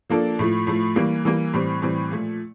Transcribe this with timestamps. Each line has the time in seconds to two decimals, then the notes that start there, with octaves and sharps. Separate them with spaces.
0.09 F3 A#3 D4 A4
0.39 A2 F3 A3
0.67 A2 F3 A3
0.96 E3 G3 A#3
1.25 E3 G3 A#3
1.53 A2 E3 G3 C4 G4
1.82 A2 E3 G3 C4 G4
2.11 A#2 F3 A3